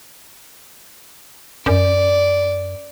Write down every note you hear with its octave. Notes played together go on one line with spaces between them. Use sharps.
F#2 D5